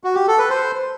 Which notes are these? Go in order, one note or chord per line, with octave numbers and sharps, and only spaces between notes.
F#4
G4
A4
B4
C5